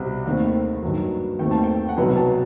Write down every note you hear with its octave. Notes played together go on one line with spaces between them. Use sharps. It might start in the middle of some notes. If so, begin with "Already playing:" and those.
Already playing: C2 B2 G3 C4
D#2 D#3 A3 C4
G2 D#3 F#3
D#2 D#3 A3 C4 G5
A5
G5
F#5
C2 B2 F#3 B3 G5
A5